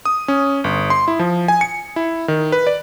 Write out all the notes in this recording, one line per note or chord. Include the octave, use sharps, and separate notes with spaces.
D#6
C#4
G1
C6
E4
F3
G#5
C#7
E4
D#3
B4
D5